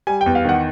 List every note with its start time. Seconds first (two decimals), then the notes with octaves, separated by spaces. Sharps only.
0.07 G3 G#5
0.21 G5
0.26 E2
0.35 F5
0.45 D#3 F#5